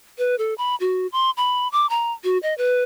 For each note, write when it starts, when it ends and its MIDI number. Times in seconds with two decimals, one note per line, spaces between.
0.18 0.36 71
0.38 0.54 69
0.58 0.76 83
0.80 1.07 66
1.12 1.31 84
1.37 1.68 83
1.72 1.89 86
1.90 2.12 82
2.24 2.38 66
2.43 2.54 75
2.58 2.84 71